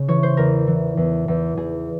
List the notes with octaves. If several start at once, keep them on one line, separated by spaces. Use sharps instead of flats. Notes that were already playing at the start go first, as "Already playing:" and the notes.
Already playing: C#3
E3 C#5
C5
E2 A#4
E3
E2
E2
E2 G#4